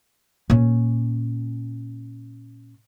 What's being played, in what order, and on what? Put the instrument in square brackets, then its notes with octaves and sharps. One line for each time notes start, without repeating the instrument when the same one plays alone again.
[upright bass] A#2 C#4